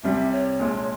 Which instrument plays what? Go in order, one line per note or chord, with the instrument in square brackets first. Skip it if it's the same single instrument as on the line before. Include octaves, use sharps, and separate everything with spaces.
[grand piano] C2 C3 G3 [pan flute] E5
[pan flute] C#5
[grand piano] A#1 A#2 G#3